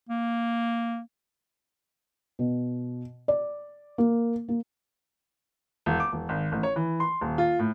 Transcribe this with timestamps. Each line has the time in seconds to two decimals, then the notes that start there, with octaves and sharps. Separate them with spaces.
0.09 A#3
2.39 B2
3.28 D5
3.98 A#3
4.49 A#3
5.86 E1
6.00 D6
6.12 E1
6.29 G#1
6.52 A1
6.63 C#5
6.76 E3
7.00 C6
7.21 D#1
7.38 F4
7.59 A2